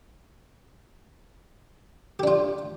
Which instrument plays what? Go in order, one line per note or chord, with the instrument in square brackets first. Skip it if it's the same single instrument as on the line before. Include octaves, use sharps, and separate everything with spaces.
[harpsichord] G4
D4
F4